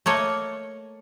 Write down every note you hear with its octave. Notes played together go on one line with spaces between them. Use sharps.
A3 A#3 C#5 D#5